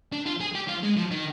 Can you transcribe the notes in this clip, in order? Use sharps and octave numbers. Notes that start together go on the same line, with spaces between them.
D4
F4
G#4
G4
F4
G#3
F3
D#3